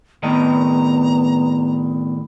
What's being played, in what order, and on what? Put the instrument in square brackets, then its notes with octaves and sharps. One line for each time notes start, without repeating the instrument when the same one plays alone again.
[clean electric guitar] A2 D#3 D#5 [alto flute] B3 [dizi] A#5